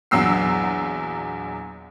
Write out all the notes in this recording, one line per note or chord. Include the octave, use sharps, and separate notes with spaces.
A#1 E2 F#3 E6 C7